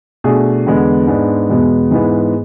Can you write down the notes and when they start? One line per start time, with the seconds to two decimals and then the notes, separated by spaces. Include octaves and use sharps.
0.24 B2 A3 D4 G#4
0.66 E2 D3 G#3 B3
1.07 G#2 G#3 B3 D4
1.50 E2 B2 G#3 B3
1.91 G#2 E3 G#3 B3